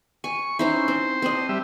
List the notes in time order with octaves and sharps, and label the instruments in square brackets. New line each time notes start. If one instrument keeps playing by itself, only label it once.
[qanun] G#5 [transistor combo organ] C#6
[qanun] C#4 D#4 E4 [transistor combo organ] C5
[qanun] C4
C4 D4 D#5
[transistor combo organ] G3 E5